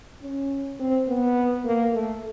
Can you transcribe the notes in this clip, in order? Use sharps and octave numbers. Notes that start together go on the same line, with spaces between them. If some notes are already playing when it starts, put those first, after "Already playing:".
C#4
C4
B3
A#3
A3